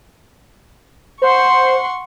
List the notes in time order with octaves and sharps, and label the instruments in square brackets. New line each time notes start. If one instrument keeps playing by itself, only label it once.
[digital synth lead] C5 [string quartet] F#5 C6 C#6